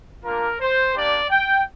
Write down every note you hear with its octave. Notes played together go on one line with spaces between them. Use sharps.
A#3 D4 F4 A#4
C5
A#3 D4 G4 D5
G5